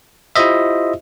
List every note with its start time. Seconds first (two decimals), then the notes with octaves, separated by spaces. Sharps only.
0.36 E4 F4 G4 C5 D#5 E5